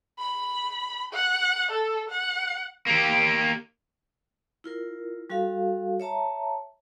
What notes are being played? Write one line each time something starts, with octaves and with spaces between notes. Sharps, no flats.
B5
F#5
A4
F#5
A#3 G4
E4 F4 A#4
G3 F#4 A4 F5
C#5 E5 A5 A#5